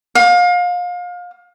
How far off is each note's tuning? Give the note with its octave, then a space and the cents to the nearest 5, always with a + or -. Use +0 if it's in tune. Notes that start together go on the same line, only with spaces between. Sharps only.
F5 +30